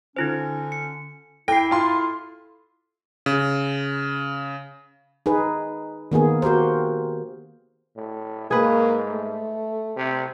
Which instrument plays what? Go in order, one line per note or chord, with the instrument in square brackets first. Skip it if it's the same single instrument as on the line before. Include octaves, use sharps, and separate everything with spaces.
[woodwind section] D3 C#4 [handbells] D#4 F4 C5
[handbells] C#7
[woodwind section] E4 [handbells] A4 C7 [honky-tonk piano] G5
[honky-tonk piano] F4 C6
[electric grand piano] C#3
[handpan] D#4 G#4 B4
D#3 A#3 B3 G#4
F#4 G4 A#4 C5
[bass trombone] A2
[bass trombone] G#2 [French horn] A#3 [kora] G#4 B4
[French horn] A3
[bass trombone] C3